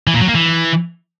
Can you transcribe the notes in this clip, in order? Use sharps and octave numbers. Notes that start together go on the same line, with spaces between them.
E3
A#2
F#3
A#3
E3